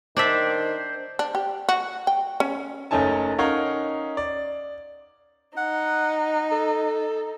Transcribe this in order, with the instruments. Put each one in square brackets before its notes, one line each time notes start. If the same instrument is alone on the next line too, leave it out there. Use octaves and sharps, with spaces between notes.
[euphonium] D#3 [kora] D4 D5 E5 [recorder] C5
[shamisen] D4
G4
F#4
G5
C#4
[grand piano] F#1 A3 C#4 D#4 G#5 A5
C#4 D#4 A#4 C#5 F5 F#5
D5
[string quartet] D#4 [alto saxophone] F#5
[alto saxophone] A4